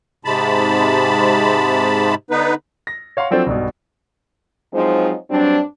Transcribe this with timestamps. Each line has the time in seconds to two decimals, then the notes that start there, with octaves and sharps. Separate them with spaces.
0.25 G#2 C3 G#3 A5 B5
2.31 D3 B3 D#4 B4
2.87 A#6
3.17 C#5 F5 F#5 C6
3.31 F3 F#3 C4 D4 A4 C5
3.47 B1 G2 B2
4.74 F3 F#3 G#3 C4 D#4 C5
5.30 G2 F#3 G3 C4 D4